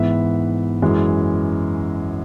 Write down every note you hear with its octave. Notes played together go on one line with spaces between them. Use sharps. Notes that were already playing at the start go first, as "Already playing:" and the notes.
Already playing: G#2 E3 B3 E5
F#2 E3 G#3